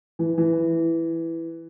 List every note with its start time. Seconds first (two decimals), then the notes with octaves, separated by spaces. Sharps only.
0.19 E3
0.38 E3